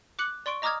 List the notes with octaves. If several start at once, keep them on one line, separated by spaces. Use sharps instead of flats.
D6 F#6 C#7 F#7
D5 C6 C#6 D7
D#5 A#5 D6 D#6 F6 G#6